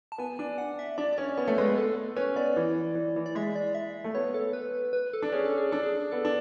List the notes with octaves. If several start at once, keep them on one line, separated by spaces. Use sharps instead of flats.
A5
B3 G#5
D4 G#5
F#5
E5
D4 D5
D5
C#4 C#5
B3 C#5
A3
G#3 B4
B3
A4
C#4 B4
B3 D5
E3
E3
E3
D5
G#3 E5
D5
E5
A3
B3 C#5
A4
B4
B4
A4
D4
C#4 G#4
A4
G#4
D4 A4
G#4
B3 A4
D4